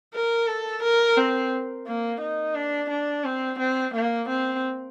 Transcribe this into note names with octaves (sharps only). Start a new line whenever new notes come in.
A#4
A4
A#4
C4
A#3
D#4
D4
D4
C4
C4
A#3
C4